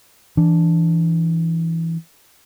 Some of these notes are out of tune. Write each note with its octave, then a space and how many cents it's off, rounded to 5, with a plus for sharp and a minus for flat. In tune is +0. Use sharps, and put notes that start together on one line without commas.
E3 +0 D4 +0